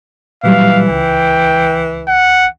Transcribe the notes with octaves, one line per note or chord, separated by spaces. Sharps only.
A#2 E3 F#3 G3 F5
C#2 G5
F#5